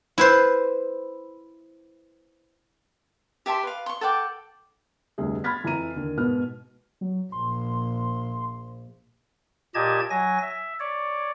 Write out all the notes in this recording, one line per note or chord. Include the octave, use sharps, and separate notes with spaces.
E4 B4 C5
G4 E5 A5 C6
B4 F5
C6 C#6
A4 F#5 G5 D6
F1 D2 G3 G#4 E5
B5 C6 F6 G#6 A6 B6
F2 E3 E4 E5 A#5 D#7
D#2 D3
G#2 B2 B4 F6
F#3
A#1 C6
A#2 G4 D#5 A5 G#6
F#3 G#5 A#6
E5
C#5 D5